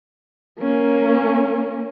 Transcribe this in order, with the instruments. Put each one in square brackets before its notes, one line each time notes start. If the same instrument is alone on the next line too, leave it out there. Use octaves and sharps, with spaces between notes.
[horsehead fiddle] A#3 C#4